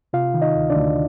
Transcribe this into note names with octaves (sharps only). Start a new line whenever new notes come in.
C3 F4 F5
D#3
D#4 D#5
D2
D4 D5
D2